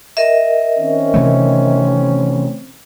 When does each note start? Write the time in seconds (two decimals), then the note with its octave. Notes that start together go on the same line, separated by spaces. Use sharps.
0.17 A#4 D#5 E5
0.80 D#3 C4 C#4
1.14 C3 E3 A3